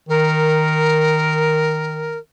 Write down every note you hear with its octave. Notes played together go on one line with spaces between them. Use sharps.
D#3 A#4